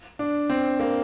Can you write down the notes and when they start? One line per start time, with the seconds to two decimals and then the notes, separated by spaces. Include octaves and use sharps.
0.19 D4
0.50 C4
0.80 A#3